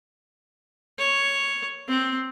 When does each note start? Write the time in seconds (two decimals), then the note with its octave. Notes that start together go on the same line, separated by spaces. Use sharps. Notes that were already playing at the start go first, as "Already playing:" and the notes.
0.99 C#5
1.89 C4